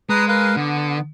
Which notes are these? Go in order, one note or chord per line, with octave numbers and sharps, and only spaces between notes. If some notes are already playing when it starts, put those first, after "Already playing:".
G#3 B4 A#5 D#6
A#4 B4 F5
D3 B3